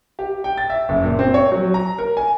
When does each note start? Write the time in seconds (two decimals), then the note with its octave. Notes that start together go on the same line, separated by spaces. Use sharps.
0.19 G4
0.44 G5
0.57 A6
0.70 E5
0.89 F#1
1.03 A#2
1.19 C4
1.34 C#5
1.52 F#3
1.74 A#5
1.98 A#4
2.17 G#5